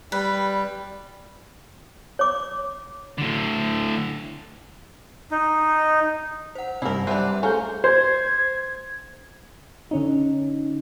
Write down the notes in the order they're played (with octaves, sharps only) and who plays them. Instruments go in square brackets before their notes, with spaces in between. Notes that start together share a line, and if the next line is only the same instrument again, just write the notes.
[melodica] G3 [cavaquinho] B4
[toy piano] C#5 D6
[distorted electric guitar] A2 D3
[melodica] D#4
[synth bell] C5 F#5
[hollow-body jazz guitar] G2 C3 [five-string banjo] E4 A#4
[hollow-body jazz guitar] G3 [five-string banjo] D4 B4 [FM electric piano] C5 C6 [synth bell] E5 F#5 F#6
[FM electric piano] A3 F5 G6 [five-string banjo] C#4 A#4 C5 [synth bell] G#4
[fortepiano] C5 [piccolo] G#6
[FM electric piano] D3 C#4 D#4